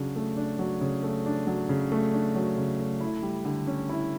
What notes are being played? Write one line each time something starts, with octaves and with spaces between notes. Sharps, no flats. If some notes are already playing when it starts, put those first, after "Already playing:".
Already playing: C#3 F#3 D4
A3
D4
F#3
C#3
A3
D4
F#3
C#3
A3
D4
F#3
C#3
A3
E4
G3
D3
C#4
E4